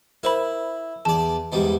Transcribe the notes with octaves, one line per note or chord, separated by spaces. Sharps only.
E4 A#4 C5 B5
E2 D5 A5
E2 G#2 G3